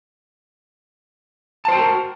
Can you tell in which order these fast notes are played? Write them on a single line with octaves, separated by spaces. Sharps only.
A5 C5 G5 F#4 A#4